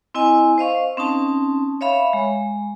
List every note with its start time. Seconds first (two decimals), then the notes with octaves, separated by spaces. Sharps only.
0.14 C4 E4 D#5 G#5
0.58 C5 D#5 F5 C#6
0.97 C4 C#4 D#4 A5
1.81 C#5 E5 F5 B5 C#6
2.13 G#3